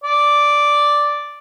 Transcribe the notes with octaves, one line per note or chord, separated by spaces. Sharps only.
D5